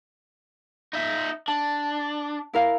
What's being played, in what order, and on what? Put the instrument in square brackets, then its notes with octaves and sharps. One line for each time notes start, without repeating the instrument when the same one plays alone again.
[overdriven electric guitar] D#4 E5
[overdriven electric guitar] D4 [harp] A5
[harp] E4 A#4 F5